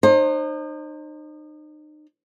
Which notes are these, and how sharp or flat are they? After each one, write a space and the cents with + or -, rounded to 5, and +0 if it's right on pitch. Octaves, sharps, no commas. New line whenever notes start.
D#4 -35 C5 +30